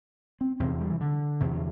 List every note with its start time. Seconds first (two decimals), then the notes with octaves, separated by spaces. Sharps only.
0.41 C4
0.60 E2 C3 C4
0.81 G3
0.90 E3
1.01 D3
1.40 E2 C3